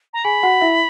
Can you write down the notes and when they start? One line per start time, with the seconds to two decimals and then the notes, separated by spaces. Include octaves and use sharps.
0.14 A#5
0.24 G#4 G#5 B5
0.43 F#4 F#5
0.61 E4 E5